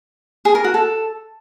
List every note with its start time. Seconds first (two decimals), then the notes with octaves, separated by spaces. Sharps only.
0.45 G#4
0.55 A#4
0.64 F#4
0.74 A4